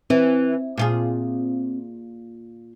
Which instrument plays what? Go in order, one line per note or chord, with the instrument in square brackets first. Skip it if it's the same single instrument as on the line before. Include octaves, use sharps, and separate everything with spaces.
[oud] E3 [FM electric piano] C4
[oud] A#2 F4 G#4